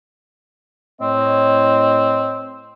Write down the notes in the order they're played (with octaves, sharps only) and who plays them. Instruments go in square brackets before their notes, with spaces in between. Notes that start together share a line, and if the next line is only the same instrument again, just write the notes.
[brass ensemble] A2 C#5 D#5 [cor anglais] C4